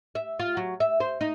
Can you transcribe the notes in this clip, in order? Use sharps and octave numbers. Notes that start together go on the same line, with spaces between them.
E5
F4
F#3
E5
C5
D#4